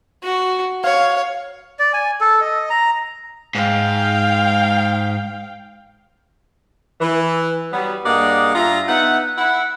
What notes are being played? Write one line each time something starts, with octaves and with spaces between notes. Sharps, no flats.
F#4
C#5 F5
D5
G#5
A4
D#5
A#5
G#2 F5 G5
E3
F#3 G3 B3
G2 A#3 G#4 D5 D#5 F#5
G2 F4 E5 A#5
B3 D#4 E5 F#5
E4 F#5